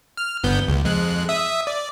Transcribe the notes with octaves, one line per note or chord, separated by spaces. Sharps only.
F6
G1 B3 G6
C#2
F2 G#3 F#6
E5 D#6
D5